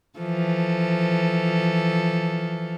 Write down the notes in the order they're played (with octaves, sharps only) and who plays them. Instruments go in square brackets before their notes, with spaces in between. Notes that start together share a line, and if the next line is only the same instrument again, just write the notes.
[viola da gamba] E3 F3 A4